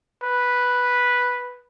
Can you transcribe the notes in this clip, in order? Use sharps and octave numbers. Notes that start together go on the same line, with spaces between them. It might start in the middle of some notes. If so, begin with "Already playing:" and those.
B4